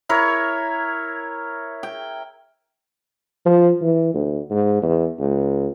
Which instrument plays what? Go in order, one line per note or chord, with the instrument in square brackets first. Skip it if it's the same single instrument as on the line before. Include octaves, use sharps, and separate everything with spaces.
[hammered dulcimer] E4 A#4 C#5
G5
[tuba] F3
E3
D2
G#2
E2
C#2